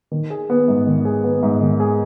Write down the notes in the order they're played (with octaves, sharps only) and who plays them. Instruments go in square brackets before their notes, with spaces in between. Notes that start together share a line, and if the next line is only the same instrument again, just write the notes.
[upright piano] D#3
G#4
B3
G#2
D#3
G#4
B3
G#2
D#3
G#4